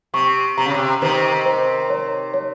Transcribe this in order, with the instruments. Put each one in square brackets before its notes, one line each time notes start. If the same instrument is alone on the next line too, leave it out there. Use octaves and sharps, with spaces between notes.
[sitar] C3 [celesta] C#6
[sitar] C3 [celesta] A#5
[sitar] C#3
C3
[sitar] C3 D#3 [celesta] C5
[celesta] C5
C#5
C#5